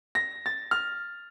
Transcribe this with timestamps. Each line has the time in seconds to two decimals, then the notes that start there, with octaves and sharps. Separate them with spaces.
0.15 A#6
0.46 A6
0.71 F6